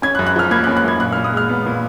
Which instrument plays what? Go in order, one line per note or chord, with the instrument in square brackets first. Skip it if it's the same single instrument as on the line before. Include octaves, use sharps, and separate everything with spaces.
[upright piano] C#4 G#6
F#6
F#2
F#6
F3 F6
A#3 G#6
F#6
C#4
F#6
F#2 G#6
A#2 F#6
F6
A#2
D#6
G#3 F6
B3
A#2